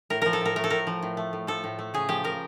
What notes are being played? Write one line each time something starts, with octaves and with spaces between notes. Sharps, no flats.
A2 A#4
F3 A#4
A4
A2 A#4
A3 A#4
A4
A2 A#4
F3
A2
A3
A2
F3 A4
A2
A3
C#3 G#4
F3 G4
C#3 A#4